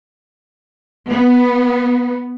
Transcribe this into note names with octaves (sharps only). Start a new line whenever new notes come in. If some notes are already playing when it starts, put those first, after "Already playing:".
B3